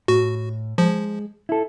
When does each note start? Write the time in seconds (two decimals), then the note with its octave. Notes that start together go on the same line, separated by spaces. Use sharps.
0.08 A2 F#4
0.78 F3 G#3
1.49 E4 A4